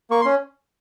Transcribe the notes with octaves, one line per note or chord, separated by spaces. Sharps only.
A#3 C#6
C6
C#4